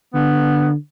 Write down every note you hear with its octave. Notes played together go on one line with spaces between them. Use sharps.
D3 B3